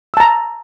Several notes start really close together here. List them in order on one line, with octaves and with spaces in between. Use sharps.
E6 A5 A#5